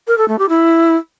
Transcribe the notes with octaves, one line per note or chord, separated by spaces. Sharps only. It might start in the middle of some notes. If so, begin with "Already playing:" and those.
A#4
A4
A3
G4
E4